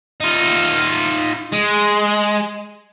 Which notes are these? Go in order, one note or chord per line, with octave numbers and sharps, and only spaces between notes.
D#4 F4
G#3